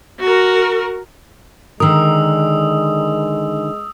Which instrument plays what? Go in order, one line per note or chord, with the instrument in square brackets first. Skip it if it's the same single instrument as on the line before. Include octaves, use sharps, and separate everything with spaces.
[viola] F#4 A#4
[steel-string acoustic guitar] D3 D#3 A#4 [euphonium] G#3 [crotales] D#6 E6